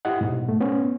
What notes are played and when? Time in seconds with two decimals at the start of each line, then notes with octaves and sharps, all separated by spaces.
0.05 E4 G4 D#5 F#5
0.21 G#2 B2
0.49 A3
0.61 B3 C#4